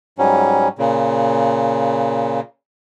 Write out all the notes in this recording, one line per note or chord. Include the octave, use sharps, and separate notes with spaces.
G#2 F#3 G3 C#4
A#2 C#3